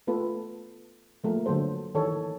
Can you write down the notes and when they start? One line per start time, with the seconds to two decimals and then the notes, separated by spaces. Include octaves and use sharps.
0.07 A3 B3 F4 A4 B4
1.24 F3 A3 A#3 A#4
1.46 D3 F#3 B3 A4 C5
1.95 D#3 E3 A4 C#5